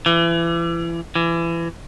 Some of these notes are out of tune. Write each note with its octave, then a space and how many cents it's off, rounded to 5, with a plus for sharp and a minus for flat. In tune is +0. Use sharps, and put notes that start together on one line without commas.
E3 +35
E3 +30